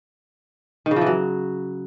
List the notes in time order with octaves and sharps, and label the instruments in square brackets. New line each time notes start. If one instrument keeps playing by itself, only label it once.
[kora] D#3
C#3
F3
E3
F#3